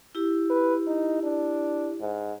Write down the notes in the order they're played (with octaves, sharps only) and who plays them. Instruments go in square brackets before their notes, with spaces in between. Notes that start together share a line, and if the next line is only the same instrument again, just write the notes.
[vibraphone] E4 G4
[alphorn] B4
D#4
D4
G#2